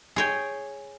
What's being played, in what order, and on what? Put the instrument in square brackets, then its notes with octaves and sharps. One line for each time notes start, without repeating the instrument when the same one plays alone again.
[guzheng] G#4 C#5 G5